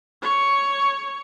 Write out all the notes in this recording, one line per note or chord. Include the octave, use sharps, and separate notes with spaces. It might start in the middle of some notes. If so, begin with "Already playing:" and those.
C#5 C#6